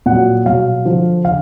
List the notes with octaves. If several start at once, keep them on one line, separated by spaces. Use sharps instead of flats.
A#2 F#3 F#5
B2 F#3 F5
D3 F3
D3 F5